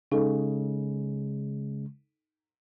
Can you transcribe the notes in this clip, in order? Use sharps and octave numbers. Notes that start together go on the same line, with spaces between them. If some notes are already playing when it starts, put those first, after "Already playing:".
C#3 G#3 D#4 A4